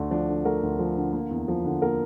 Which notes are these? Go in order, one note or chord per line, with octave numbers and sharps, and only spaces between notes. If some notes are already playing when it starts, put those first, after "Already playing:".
Already playing: D2 A3 D4
F3 D4
D3
A3 A#4
D2
F3
D3
A#3
E2
F3
D3
A#3 A#4